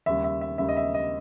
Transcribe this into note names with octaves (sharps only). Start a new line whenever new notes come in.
D#2 C#3 G3 E5
E5
E5
D#2 C#3 G3 E5
D#5
E5
D#5